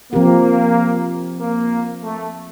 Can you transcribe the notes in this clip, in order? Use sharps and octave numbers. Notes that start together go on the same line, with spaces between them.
F3 A#3 C4 G4 A#4
A#3
A3